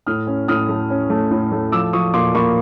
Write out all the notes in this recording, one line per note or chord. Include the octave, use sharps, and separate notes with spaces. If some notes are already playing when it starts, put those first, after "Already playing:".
A2 D#6 F6
C#4
A2 D#6 F6
A3
C#4
A3
A2
A3
F3 D6 E6
F3 C#6 D#6
A#2 C6 D6
A#3 B5 C#6